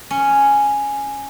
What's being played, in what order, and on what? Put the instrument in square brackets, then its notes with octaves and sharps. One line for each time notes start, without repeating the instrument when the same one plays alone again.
[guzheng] C#4